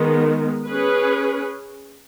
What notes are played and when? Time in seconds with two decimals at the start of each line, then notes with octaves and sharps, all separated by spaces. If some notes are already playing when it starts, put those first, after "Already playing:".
Already playing: D#3 G#3 B3
0.66 C#4 G#4 B4